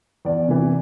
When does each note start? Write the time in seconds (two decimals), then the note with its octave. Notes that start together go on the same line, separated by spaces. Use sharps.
0.25 E2 D5
0.48 C3 E3